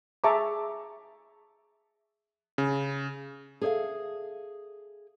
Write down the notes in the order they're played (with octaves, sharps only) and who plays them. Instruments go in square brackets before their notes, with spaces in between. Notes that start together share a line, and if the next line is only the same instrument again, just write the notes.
[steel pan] G#4 E5 A5 A#5 C#6 D6
[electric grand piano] C#3
[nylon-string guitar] G#4 A4 C#5 E5 F5